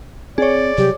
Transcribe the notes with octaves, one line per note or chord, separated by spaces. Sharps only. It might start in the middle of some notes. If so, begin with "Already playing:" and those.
C4 G#4 C#5 D5
C3 F#3 G3 G4